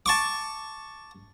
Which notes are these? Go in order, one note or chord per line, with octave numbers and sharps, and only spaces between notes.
A5 C#6 D6